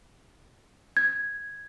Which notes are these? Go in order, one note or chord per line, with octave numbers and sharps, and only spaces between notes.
G#6